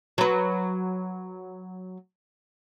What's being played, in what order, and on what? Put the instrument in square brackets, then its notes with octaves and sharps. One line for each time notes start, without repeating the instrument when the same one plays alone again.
[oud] F#3 B4